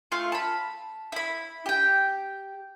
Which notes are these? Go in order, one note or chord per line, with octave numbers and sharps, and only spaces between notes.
A3 F4 F5
A5 B5
E4 B5
G4 G5